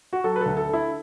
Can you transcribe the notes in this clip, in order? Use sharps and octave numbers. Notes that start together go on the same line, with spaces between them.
F#4
F#3 A4
B4
D2 A4
A4
D3
E4